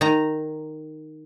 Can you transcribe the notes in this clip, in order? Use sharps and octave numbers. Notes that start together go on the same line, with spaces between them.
D#3 A#5